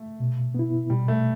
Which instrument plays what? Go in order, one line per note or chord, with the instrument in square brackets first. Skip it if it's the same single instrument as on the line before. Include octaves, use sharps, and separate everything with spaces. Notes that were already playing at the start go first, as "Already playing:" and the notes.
Already playing: [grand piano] A3
[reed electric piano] B2
B3 E4
[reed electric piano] B2 [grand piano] G3
[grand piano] A3